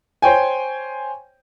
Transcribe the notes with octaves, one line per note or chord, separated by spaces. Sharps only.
C5 C#5 G5 G#5